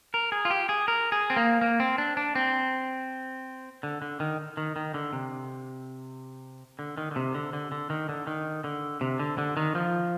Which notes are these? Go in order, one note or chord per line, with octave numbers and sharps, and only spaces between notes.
A#4
G#4
F4
G4
G#4
A#4
G#4
C4
A#3
A#3
C4
D4
D4
C4
D3
D3
D#3
D#3
D#3
D3
C3
D3
D#3
D3
C3
D3
D3
D3
D#3
D3
D#3
D3
C3
D3
D3
D#3
F3